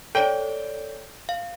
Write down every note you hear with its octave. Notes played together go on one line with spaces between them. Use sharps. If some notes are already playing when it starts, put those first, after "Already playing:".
A4 C#5 D5 G5
F5